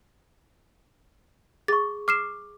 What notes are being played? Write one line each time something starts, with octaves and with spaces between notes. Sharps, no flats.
G#4 C#6 A6
D6 F6 C7 E7